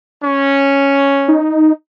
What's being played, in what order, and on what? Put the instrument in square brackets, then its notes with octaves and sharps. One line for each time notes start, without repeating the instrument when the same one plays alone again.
[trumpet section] C#4
[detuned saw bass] D#4